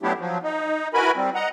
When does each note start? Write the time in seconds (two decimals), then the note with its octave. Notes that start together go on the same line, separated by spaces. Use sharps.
0.03 F#3 A3 B3 D4 E4 G4
0.19 F3 F#3
0.43 D#4
0.94 E4 F#4 A#4 B4 G#5 B5
1.16 G3 C4
1.35 D#5 F#5 A#5